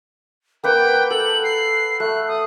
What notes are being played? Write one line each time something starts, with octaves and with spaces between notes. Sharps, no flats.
A#3 B4 F#5 G5
A4 F#7
C7
A3 F#6
D#6